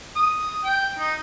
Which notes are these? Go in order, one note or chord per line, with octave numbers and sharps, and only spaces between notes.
D#6
G5
D#4